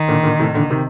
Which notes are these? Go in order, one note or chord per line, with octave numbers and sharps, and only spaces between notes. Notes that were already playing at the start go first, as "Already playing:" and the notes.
Already playing: D#3
A#2 D3
A#2 D3
A2 C3
A#2 D3
C3 D#3